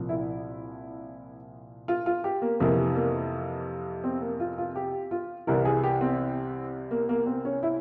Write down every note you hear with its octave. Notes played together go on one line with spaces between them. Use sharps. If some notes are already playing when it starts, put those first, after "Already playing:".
Already playing: C2 A#2 F3
E4
F4
F4
G4
A#3
F2 C3 E3 A#3
A#3
C4
A#3
F4
F4
G4
F4
C2 C3 E3 A#4
G#4
G4
C4
A#3
A#3
C4
C#4
E4